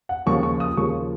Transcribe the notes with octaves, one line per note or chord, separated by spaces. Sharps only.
F#5
D#2 C#3 F3 A#3 F4 C#6
C#6
D#6
D#2 C#3 F3 A#3 F4 C#6